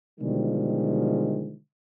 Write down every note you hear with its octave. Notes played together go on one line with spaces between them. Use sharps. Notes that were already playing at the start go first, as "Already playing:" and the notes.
B2 D3 D#3 F3 G3 G#3